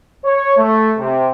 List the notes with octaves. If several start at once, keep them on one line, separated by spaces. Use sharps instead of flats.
C#5
A3
C3